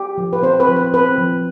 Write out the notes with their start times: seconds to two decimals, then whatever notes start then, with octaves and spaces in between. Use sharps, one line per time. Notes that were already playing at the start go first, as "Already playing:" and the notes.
Already playing: G4
0.18 F3
0.33 B4
0.43 C4 C5
0.60 B4
0.69 F3
0.76 B4
0.94 C4 B4
1.18 F3